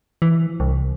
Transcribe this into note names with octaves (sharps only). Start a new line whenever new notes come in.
E3
C2